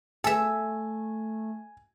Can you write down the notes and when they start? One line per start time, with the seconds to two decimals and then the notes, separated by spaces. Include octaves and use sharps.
0.24 A3 A4 E5 G#5